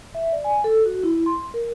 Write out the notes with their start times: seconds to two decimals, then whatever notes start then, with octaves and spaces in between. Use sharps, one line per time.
0.15 E5
0.32 D5
0.44 G#5
0.64 A4
0.86 F#4
1.03 E4
1.26 C6
1.54 A#4